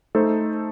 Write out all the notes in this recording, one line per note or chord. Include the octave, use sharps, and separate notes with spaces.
A3 D#4 A4 C5